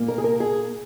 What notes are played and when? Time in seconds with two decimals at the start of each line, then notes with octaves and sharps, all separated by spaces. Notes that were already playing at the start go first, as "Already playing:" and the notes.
Already playing: A#2 A#3
0.08 A#4
0.18 G#4
0.24 A#4
0.40 G#4